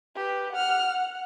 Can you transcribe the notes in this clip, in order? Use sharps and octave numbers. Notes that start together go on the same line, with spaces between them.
G4 B4
F#5 F6
F#5